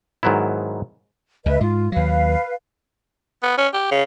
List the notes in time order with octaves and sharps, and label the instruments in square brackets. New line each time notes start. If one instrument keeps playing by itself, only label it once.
[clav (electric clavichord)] G#2 D#3 F#3 B3 E4
[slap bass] C#2 C#3 [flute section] B4 D#5 E5
[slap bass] G#2 [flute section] F4
[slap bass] D#2 F#3 [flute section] B4 F5
[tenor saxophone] B3
C#4
G4
C#3